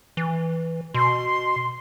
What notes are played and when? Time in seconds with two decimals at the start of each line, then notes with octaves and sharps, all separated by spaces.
0.17 E3
0.94 B2 C6